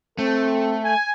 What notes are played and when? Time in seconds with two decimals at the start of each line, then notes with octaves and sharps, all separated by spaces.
0.19 A3 C4 A4
0.84 G#5